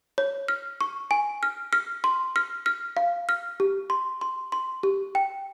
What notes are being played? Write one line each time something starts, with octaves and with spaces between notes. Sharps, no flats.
C#5
F6
C#6
G#5
F6
F6
C6
F6
F6
F5
F6
G4
C6
C6
C6
G4
G5